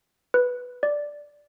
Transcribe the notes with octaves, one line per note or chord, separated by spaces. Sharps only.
B4
D5